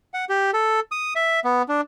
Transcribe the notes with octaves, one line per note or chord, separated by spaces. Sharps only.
F#5
G4
A4
D#6
E5
B3
D4